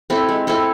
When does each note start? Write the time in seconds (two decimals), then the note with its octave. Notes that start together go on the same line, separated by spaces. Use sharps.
0.10 C4 E4 A4
0.29 G#3
0.47 C4 E4 A4